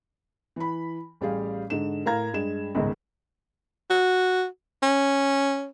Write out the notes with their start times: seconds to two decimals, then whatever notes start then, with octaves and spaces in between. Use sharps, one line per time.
0.56 E3 B5
1.21 A1 G3 G4 G#4 F5
1.70 G#2 D3 E7
2.06 A2 A#4 F5 A#5 G#6
2.33 G2 G#3 E7
2.75 G1 C#2 G#2 D#3
3.90 F#4
4.82 C#4